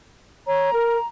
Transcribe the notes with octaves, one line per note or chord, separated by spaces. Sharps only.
C#5 A#5
A#4